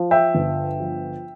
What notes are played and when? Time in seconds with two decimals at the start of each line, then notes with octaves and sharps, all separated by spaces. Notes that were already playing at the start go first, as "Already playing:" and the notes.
Already playing: F3
0.11 E5 G5
0.34 G1
0.80 F3